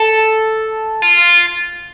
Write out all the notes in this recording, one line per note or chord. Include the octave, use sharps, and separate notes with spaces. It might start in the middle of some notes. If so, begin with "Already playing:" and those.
Already playing: A4
F4